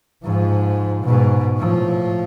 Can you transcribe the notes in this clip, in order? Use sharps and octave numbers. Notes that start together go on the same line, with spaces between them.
G#2 F3
G#2 B2
A2 F3